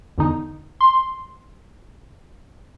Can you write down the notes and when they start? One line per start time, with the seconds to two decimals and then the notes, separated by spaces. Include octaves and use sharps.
0.18 E2 D3 D#4
0.81 C6